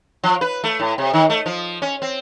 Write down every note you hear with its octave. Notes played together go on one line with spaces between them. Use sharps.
F3
B4
A3
A2
C3
D#3
A3
F3
C#4
C4